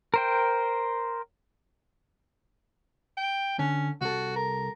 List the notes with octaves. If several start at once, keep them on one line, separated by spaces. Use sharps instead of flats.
A#4 C5 G5
G5
D3 C#4
C2 F#4 A4
A#4